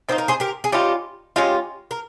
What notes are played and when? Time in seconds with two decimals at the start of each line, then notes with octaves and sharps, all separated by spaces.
0.09 D#3 A#3 D#4 C5
0.18 A#4
0.28 G#4 C5
0.40 G4 A#4
0.64 G#4
0.72 G3 C#4 D#4 F4 G4
1.36 G#3 C#4 D#4 F4 G4
1.91 A#4